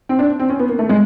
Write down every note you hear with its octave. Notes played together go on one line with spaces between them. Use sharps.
C4
D4
C4
C#4
B3
A#3
A3
G#3